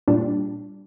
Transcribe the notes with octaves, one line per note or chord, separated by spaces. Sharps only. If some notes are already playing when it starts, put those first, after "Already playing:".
A#2 G3 D4